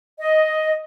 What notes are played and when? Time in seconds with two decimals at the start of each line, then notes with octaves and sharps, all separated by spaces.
0.19 D#5